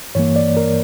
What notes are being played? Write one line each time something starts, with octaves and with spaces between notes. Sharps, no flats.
G2 E3 A#3 C#5
D5
A#4